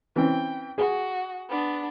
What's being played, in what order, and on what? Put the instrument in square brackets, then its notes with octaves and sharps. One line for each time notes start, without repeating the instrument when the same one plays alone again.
[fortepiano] E3 C4 C#4 [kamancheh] G5
[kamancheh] F#4 [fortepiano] G#4
[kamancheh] B3 D4